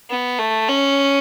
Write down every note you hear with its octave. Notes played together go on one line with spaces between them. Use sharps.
B3
A3
C#4